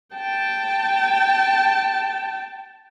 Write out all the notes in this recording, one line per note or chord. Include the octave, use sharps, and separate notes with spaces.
G5 A5